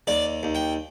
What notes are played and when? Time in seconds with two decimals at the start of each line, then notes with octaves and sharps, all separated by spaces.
0.07 D#2 D5
0.43 D#2
0.55 G5